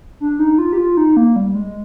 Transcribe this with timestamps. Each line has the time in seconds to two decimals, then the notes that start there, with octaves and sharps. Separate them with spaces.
0.20 D4
0.39 D#4
0.58 F4
0.73 G4
0.78 F4
0.97 D#4
1.17 A#3
1.36 G3
1.55 G#3